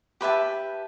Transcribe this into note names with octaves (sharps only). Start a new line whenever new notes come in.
G4 B4 E5 A5